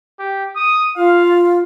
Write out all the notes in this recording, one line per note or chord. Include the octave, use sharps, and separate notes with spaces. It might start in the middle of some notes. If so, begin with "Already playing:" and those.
G4
D#6
F4 F5